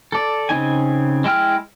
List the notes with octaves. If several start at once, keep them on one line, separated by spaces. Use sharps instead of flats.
A4 D5
C#3 C4 D#4 G#5
G#3 E4 G5 F6